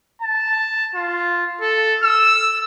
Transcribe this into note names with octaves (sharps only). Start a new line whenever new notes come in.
A5
F4
A4
E6